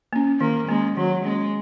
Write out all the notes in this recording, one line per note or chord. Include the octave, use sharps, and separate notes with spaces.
A#3 C#4
D#3 A#3
G#3 A#3 C#4
D#3 F#3
G#3 A#3 C#4